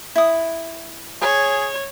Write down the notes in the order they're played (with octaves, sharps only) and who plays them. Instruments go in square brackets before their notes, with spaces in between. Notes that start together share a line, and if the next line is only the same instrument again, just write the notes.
[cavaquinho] E4 D#6
[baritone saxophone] G#4 [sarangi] C#5